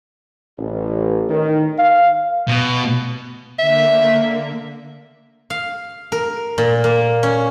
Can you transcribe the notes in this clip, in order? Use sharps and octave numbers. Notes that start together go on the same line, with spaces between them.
A1
D#3
F5
B2
D3 A#3 E5
F5
A#4
A#2
A#3
C#4